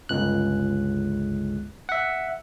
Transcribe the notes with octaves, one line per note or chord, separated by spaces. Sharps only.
G1 C#2 F#6
E5 F#5